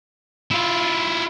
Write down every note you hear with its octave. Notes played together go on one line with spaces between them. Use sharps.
E4 F4